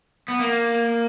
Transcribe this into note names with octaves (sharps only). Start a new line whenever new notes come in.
B3
A#3